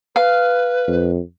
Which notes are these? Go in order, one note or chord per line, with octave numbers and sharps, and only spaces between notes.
B4 F5
F2